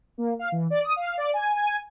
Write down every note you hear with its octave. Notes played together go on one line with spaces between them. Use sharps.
A#3
F5
E3
D5
D#6
F5
D5
G#5
G#5